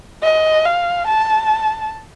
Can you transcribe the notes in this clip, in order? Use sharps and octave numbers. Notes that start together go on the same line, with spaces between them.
D#5
F5
A5